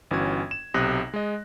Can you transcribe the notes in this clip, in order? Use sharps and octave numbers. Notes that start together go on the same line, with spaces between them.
G1 E3 C#4 F#4 G#6
E7
B1 C3 D#6 F#6 A#6
G#3 D#5